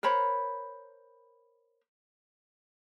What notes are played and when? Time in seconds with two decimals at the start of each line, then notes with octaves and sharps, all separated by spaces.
0.03 A#4 C5 C#5 B5